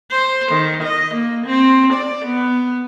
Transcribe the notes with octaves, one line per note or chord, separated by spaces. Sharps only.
C5
D#3
D#5
A#3
C4
D5
B3